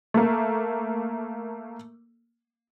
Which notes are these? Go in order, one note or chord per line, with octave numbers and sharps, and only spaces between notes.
A3 A#3